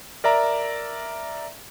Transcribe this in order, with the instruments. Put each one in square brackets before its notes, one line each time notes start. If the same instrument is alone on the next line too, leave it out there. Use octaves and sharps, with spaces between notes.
[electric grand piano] A#4 D5 E5 A#5